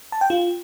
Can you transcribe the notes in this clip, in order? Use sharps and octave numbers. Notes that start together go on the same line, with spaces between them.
A5
G5
F4